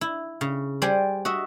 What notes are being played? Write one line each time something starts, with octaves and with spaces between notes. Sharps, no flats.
E4
C#3
G3 C5 D5 G#5
F#4 D#5 E5